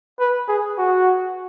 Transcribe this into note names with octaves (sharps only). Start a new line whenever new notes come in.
B4
G#4
F#4